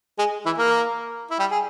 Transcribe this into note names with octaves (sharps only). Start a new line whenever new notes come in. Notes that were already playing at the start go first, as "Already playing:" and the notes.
G#3 G#4
E3 E4
A#3 A#4
E4
G3 G4
G#4